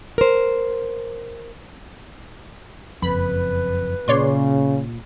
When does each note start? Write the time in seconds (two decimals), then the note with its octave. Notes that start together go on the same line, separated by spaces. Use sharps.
0.18 A#4 C5
3.02 F#1 F2 B4 B5
4.08 A#2 C#3 C#5 D5 C6